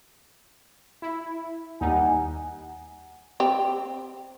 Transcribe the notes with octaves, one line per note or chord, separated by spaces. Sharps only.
E4
D#2 G3 D#4 F#5 G#5
C4 G4